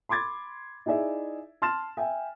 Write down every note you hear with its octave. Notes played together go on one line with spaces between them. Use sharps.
B5 C6 D6 G#6 A6
D#4 E4 G#4 D5 E5
A5 C6 F6 A6 E7
E5 G5 G#5